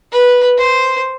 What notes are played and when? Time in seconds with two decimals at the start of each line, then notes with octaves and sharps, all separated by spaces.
0.12 B4
0.58 C5